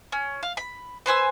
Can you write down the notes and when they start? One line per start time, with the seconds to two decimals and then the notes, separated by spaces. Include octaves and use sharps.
0.12 C#4
0.43 F5
0.57 B5
1.06 B4 C5 G#5 E6